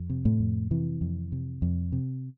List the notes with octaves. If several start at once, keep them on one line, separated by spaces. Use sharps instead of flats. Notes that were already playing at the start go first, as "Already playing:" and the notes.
Already playing: F2
C3
A2 A3
F2
C3 E3
F2
C3
F2
C3